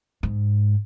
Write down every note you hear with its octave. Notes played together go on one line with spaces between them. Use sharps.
G#2